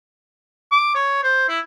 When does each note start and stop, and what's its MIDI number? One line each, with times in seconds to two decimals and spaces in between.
0.71 0.94 86
0.94 1.21 73
1.23 1.44 72
1.48 1.59 64